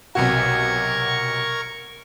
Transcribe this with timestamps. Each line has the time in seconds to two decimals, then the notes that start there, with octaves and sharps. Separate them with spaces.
0.15 B1 C3 F#4 A#4 C#6 G#6